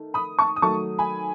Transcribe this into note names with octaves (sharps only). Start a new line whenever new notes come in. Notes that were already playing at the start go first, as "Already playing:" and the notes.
Already playing: D#3 A3
B5 D#6
A5 C#6
D#6
D#3 F#3 A3 A5 C#6
G#5 B5